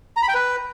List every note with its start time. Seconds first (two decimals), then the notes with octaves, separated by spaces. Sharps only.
0.17 A#5
0.23 B5
0.28 G5
0.34 B4